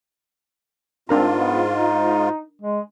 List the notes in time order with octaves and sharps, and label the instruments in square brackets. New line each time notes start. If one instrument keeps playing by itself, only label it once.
[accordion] G#2 F4 [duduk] C4 [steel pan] D4 A#4 A#5
[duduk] B3
D#4
G#3